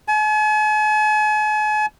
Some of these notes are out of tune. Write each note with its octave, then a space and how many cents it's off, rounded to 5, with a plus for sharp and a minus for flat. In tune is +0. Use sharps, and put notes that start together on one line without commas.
G#5 +45